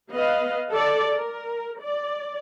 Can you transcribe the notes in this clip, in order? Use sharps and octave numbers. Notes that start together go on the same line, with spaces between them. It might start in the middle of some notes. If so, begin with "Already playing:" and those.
B3 B4 D#5 F5
A4 D5
A#4
D5